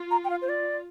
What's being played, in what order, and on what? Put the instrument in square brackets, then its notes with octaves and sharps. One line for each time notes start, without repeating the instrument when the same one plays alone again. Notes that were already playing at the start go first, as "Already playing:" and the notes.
Already playing: [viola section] F4
[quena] A#5
G5
F5
C5
D5